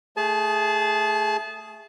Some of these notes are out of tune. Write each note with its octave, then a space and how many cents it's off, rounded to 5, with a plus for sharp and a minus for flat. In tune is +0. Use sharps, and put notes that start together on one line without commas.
A3 +0 G#4 +0 A5 -30